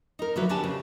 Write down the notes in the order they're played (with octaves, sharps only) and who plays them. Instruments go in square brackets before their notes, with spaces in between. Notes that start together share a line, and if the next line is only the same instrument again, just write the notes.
[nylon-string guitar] D#4 A#4
D3 F3 F#3 E4 B4
D3 D4 G4 G#5 A5
C#3